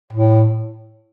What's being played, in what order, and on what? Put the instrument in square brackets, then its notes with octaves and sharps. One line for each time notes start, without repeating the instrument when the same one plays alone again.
[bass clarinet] A2